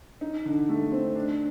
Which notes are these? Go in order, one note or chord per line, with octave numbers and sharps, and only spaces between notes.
D#4
D3
A3
C4
D4